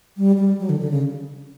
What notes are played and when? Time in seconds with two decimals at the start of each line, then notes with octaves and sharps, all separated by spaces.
0.17 G3
0.38 G3
0.59 F#3
0.69 D3
0.80 D3
0.91 C#3